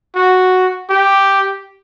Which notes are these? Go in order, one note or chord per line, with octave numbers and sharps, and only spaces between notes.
F#4
G4